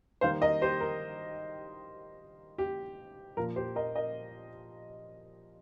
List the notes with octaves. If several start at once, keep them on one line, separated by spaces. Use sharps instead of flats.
D#3 G3 A#3 C5 F5
A#4 D#5
G4 C5
A#4
G4
A#2 F3 A#3 A#4
G4 C5
A#4 D#5
A#4 D#5